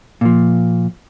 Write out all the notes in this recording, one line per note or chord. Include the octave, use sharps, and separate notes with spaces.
A#2 F3